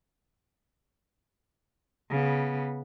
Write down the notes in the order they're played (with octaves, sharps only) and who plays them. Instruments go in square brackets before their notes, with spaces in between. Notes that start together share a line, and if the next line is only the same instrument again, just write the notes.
[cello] C#3 B3